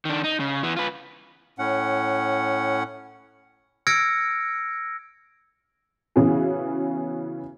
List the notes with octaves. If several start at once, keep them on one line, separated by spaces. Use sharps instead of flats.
D#3 D4
D#4
C#3
E3 B3
F4 B4
A2 C#4 F#5
E6 F6 G#6 A#6 C#7 D7
C#3 E3 B3 C#4 F#4 G#4